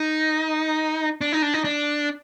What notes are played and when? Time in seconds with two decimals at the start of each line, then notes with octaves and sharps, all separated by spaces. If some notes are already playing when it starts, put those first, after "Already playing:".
Already playing: D#4
1.21 D4
1.32 D#4
1.42 D4
1.54 D#4
1.64 D4